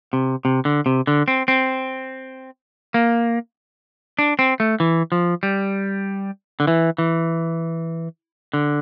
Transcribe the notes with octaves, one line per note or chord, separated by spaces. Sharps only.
C3
C3
D3
C3
D3
C4
C4
A#3
D4
C4
A3
E3
F3
G3
D3
E3
E3
D3